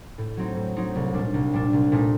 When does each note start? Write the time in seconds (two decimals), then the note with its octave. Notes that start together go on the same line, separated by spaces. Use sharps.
0.18 A2
0.37 F#3 C4 D#4
0.56 A2
0.76 F#3 C4 D#4
0.96 C2
1.14 A#2 G3 D4
1.34 C2
1.53 A#2 G3 D4
1.73 C2
1.92 A#2 A3 D#4